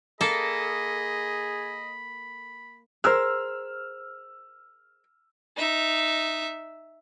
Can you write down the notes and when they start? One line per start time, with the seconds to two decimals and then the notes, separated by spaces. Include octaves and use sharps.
0.21 A#3 G#4 A4 D#5 B5
3.04 G#4 A#4 C5 E6 F6
5.57 D#4 E5